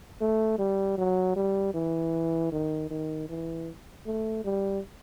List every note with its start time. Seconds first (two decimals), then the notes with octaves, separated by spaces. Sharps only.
0.21 A3
0.58 G3
0.98 F#3
1.36 G3
1.74 E3
2.52 D#3
2.90 D#3
3.29 E3
4.06 A3
4.45 G3